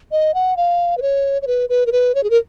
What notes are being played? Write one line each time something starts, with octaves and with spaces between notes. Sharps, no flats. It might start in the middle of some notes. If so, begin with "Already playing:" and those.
D#5
F#5
F5
B4
C#5
C#5
B4
B4
A#4
B4
C#5
G#4
A#4